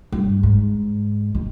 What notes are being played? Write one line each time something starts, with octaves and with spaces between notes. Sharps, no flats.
G2
G#2
D#3